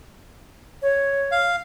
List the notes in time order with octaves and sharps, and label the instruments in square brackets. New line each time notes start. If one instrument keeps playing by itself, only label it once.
[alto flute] C#5
[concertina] F5